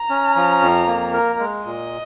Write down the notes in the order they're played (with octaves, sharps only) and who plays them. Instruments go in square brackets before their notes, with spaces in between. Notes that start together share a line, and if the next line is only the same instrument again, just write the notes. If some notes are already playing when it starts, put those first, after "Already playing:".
Already playing: [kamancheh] A#5
[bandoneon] C#4
F3
F2
A#3
A#4
G#3
[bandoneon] A#2 [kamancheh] D#5